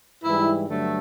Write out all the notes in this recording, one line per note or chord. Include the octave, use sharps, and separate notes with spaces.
G#2 E3 G3 E4
G2 D3 F#3 A3